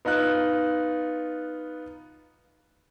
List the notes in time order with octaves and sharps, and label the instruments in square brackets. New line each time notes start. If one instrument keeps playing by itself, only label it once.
[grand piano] B3 D#4 F4 F#6